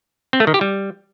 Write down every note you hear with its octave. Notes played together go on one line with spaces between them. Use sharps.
C4
A3
D#3
G4
G3